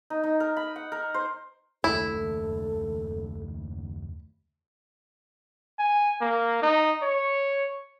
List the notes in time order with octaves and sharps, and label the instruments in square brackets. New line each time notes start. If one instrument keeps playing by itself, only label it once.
[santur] D#4
D#4
A#4
B5
F#5
A#4
C5
[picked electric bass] F#1 D#2 A3 [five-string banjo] E4 [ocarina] A4
[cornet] G#5
A#3
D#4
C#5